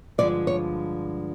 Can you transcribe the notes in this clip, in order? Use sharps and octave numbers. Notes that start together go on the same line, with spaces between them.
G2 D3 F3 G#3 D5
C#5